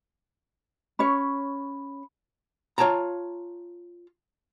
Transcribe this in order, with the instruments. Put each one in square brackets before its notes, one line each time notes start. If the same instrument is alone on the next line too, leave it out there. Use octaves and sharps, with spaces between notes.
[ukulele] C#4 C#5 [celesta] B5
[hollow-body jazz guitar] F4 C#5 G5 A5 A#5